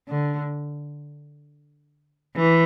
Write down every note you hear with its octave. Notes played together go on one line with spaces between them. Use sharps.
D3
E3